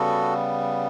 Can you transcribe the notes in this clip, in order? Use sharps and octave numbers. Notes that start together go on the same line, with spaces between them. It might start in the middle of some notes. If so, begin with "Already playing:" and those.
Already playing: C#3 G3 B3 F#4 A4